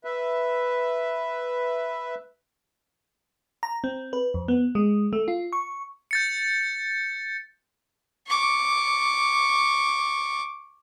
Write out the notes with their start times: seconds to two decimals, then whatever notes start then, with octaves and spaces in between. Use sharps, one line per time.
0.04 B4 E5
3.63 A#5
3.84 C4
4.13 B4
4.34 F2
4.48 B3
4.75 G#3
5.13 A3
5.28 F4
5.53 C#6
6.11 G6 A6 C#7
8.28 C#6 D6